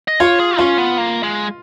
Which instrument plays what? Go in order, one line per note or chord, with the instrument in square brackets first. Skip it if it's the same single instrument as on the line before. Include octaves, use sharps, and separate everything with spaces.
[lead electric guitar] D#5
[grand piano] F4 [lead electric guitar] C#5
[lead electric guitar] G#4
[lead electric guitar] C#4 [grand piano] F4
[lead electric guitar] B3
A#3
G#3